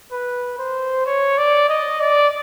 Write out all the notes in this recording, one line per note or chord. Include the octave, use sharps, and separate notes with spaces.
B4
C5
C#5
D5
D#5
D5